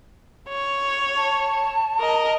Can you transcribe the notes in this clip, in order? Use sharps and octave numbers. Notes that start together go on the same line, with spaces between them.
C#5
A5
A#4 D#5